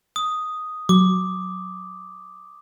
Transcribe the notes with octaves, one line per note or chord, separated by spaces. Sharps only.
D#6
F#3 D6